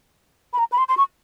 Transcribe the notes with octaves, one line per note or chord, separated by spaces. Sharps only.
B5
A#5
B5
C6
C6
C#6